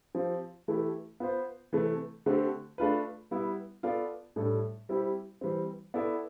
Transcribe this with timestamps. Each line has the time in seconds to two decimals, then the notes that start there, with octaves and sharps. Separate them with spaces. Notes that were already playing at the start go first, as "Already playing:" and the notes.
0.14 F3 C4 G4
0.68 E3 A3 E4 G4
1.20 B3 F4 C5
1.73 C3 E3 A3
2.26 D3 A3 C4 G4
2.78 A3 D4 F4 B4
3.31 G3 B3 E4
3.83 B3 F4 A4 D5
4.36 A2 G3 D4 A4
4.89 G3 C4 E4 G4
5.41 E3 G3 C4
5.94 B3 E4 A4 D5